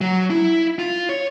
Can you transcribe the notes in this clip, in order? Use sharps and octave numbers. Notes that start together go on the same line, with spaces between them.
F#3
E4
F4
C#5